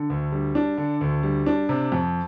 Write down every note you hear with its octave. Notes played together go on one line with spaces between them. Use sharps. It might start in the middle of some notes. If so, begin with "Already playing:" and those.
Already playing: D3
D2
G3
D4
D3
D2
G3
D4
C3
F2